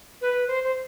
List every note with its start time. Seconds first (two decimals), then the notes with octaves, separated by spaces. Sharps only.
0.21 B4
0.47 C5
0.64 C5